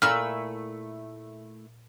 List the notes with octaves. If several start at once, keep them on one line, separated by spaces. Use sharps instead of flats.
A#2 A3 E4 E6 F6